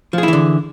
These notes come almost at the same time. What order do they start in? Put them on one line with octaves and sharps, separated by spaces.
F3 G#4 E4 E3 D3